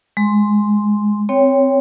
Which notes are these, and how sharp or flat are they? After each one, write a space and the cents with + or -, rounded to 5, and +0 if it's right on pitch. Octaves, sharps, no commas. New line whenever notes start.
G#3 +0 C6 +0
C4 -10 C#5 +0 G5 +15